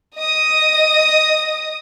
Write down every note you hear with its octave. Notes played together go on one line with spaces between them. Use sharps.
D#5 D#6